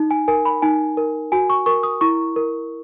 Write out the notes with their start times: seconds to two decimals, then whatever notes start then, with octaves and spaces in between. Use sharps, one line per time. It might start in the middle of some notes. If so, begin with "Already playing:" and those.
Already playing: D#4
0.11 G#5
0.28 A#4 G#5
0.45 B5
0.62 D#4 G#5
0.97 A#4
1.32 F#4 G#5
1.50 C#6
1.66 A#4 C#6
1.83 D#6
2.01 E4 C#6
2.36 A#4